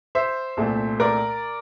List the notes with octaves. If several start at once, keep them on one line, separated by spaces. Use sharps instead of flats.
C5 E5
C2 A#2 A3
A#4 D5